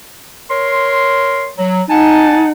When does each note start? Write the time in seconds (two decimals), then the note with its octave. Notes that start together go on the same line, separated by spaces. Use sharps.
0.50 A#4 C#5 C6
1.58 F#3
1.90 D#4 F#5 G#5 A5